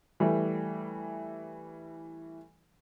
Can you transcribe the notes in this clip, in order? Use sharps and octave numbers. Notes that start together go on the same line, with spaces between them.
E3 G3 A3